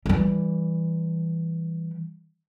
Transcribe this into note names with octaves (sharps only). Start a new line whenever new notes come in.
E3 G3